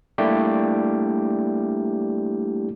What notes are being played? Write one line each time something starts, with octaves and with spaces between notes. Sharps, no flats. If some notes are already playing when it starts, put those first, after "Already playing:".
G3 A3 A#3 D4 E4 G4